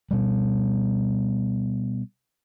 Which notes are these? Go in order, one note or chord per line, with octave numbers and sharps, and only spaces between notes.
B2 G3